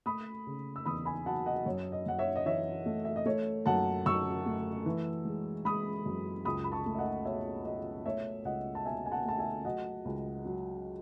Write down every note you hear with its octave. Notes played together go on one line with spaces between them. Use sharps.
A3 B5 D#6
C#3
E6
E2 B5 D#6
G#5 B5
F#3 F#5 A5
D#5 F#5
F#2 C#5
D#5
F#2 F#5
C#5 E5
D#5
E3 C#5 E5
A3
E5
D#5
A3 C#5
F#2 F#5 A5
F#2 C#6 E6
A3
E3
G#3
G#3 B5 D#6
F#2
C#2 B5 D#6
B5
A5 C#6
A3
E5
D#5 F#5
B2 C#5 E5
B2 D#5
A3 C#5 E5
C#2 D#5 F#5
A5
B2 E5 G#5
G#5
F#5 A5
A3 A5
E5 G#5
F#3 D#5 F#5
C#2
F#3